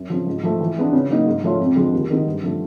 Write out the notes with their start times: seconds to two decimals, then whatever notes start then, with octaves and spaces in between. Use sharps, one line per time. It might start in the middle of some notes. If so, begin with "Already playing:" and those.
Already playing: F#2
0.10 C#3 F3
0.27 G#2
0.43 F3 A3
0.61 E3
0.77 G#3 B3 D4
0.93 C#3
1.09 F#3 A#3 D#4
1.26 G#2
1.43 F3 A3 C#4 F4
1.60 F2
1.76 D3 F3 G#3
1.92 D#2
2.10 D#3 G#3 B3 D#4
2.26 G2
2.42 D3 F3 A3